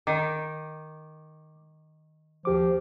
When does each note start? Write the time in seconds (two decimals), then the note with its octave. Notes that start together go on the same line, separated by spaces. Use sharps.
0.07 D#3 D6
2.45 D#2 F3 G4 D6